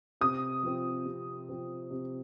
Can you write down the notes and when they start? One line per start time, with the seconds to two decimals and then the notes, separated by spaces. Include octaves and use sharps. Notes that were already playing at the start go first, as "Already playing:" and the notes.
0.21 C3 D#6
0.63 F3 C4
1.06 C3
1.49 F3 C4
1.91 C3